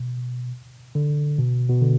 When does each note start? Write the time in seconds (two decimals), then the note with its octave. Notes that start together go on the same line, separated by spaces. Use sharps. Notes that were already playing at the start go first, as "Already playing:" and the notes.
Already playing: B2
0.95 D3
1.38 B2
1.70 B2
1.82 D3